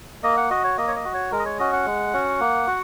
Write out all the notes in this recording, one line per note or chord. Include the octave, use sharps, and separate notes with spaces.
A#3 D#5
F#5
F#4 D#5
C#5
A#3 D#5
C#5
D#5
F#4
C#5
G#3 A#4
D#5
C#5
C#4 F#4 D#5
F#5
G#3
C#4 F#4
A#3
F#4